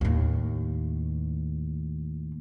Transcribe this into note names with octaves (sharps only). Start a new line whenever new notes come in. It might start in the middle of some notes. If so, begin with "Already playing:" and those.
D#2 A2